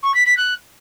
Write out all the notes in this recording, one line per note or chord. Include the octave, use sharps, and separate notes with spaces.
C#6
B6
B6
F#6